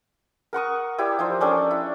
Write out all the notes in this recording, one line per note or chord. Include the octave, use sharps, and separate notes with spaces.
A#4 F#5 C#6 D#6
E4 G4 D5
F3 D#4 C5
C#4 D4 A4 G5
E4